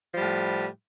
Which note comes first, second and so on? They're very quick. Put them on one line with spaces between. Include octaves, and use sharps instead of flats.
F3 G3 A2